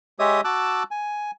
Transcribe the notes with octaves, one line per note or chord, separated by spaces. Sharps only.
G#3 G4 C#5 D#5 E5 D#6
F#4 A5 D6 E6 F#6
G#5